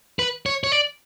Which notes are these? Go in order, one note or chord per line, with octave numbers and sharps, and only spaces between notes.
B4
C#5
C#5
D5